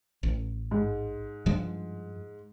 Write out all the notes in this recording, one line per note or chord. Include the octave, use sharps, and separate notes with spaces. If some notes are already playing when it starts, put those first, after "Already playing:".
A1
G#2
G2 F3 G#3